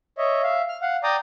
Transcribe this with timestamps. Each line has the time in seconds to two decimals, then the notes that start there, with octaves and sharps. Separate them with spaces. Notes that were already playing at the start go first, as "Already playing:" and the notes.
0.18 C#5 D#5 E5
0.43 E5 F5
0.69 F6
0.82 F5 F#5
1.03 D5 G5 A#5 D6 D#6